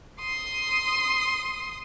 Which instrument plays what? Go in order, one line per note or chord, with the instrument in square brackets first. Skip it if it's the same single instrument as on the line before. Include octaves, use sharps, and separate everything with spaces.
[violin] C6 D#6